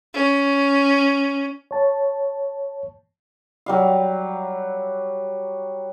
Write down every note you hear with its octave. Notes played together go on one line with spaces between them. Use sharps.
C#4
C#5 A5
F#3 G3 F5